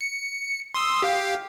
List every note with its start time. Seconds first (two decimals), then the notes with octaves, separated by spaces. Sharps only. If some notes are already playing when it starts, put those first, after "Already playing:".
0.01 C#7
0.74 C6 D#6 E6
1.02 G4 F5 G5